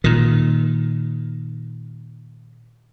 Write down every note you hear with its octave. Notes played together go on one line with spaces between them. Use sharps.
A#2 D#3